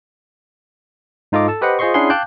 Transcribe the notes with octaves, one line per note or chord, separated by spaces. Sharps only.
G#2 D#4 F4 A4 D#5 D6
A4 A5
G4 B4 C5 D#5 F#5
F4 G#4 C5 D#5 C6 C#6
C#4 D4 E4 G#4 F#5 C6
F5 G5 A5 D6 F#6 G6